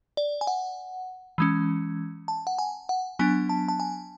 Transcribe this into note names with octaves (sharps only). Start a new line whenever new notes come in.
D5
G#5
F#5
E3 G#3 C#4
A5
F#5
G#5
F#5
F#3 B3 D4 G#5
A5
A5
G#5